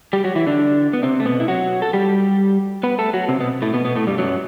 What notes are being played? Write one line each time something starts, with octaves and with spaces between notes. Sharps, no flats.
G3 G4
F#3 F#4
E3 E4
D3 D4
B3
C3 C4
A3
B2 B3
E4
F#3 F#4
A4
G3 G4
B3 B4
A3 A4
F#3 F#4
C3 C4
B2 B3
A2 A3
B2 B3
B2 B3
A2 A3
G2 G3
F#2 F#3